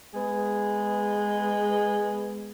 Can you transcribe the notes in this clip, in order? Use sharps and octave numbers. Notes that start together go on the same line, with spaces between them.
G#3 B3 G#4